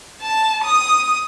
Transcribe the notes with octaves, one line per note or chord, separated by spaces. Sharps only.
A5
D#6